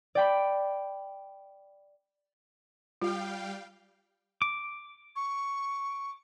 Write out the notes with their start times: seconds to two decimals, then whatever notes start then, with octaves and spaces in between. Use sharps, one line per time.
0.15 D5 G5 B5
3.02 G3 F4 F5 G5
4.42 D6
5.16 C#6